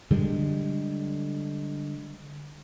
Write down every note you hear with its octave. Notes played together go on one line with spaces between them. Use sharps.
D3 G3 G#3